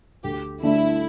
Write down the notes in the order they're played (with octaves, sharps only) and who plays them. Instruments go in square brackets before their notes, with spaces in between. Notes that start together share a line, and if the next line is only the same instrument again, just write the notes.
[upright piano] D2 [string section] G4
[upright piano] D3 A3 D4 [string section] E4